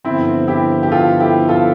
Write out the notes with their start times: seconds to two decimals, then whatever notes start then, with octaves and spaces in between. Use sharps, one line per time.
0.04 G2 D3 F3 B3 C4 E4
0.47 E4 G4
0.83 G4
0.92 F4 A4
1.20 E4 G4
1.49 F4 A4